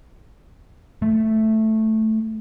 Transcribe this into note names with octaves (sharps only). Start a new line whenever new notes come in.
A3